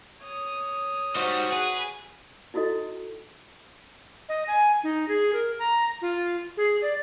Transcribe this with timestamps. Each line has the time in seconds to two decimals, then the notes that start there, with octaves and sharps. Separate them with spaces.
0.21 C#5 D#6
1.16 G3 D#4 F#4 C5
1.52 G#4 B4
2.54 D#4 E4 F#4 A4 D#5
4.29 D#5
4.48 G#5
4.84 D#4
5.08 G#4
5.33 A#4
5.59 A#5
6.02 F4
6.57 G#4
6.82 D5